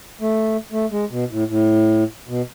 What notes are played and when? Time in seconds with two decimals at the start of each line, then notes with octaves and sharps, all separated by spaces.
0.21 A3
0.72 A3
0.91 G#3
1.11 B2
1.30 A2
1.49 A2
2.28 B2